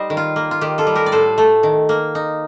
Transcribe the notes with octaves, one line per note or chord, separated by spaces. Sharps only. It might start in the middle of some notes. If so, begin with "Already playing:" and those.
Already playing: G3 D#4 C5 D#5
D#3
F4
A#3
F4
D#3 G4
F4 A4
G3
G4 A#4
D5
A2 A4 C5
A3
D#3
A#3
D#4